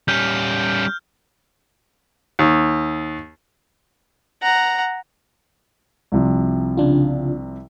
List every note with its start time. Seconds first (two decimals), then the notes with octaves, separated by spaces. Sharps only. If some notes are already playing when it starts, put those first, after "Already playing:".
0.08 G3 C#4 F6 G6
2.39 D#2
4.42 F#5 A#5
6.12 C2 C3 F3
6.77 C#3 D4 F4